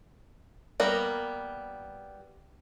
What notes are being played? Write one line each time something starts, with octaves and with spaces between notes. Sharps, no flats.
G3 A#3 B3 A#4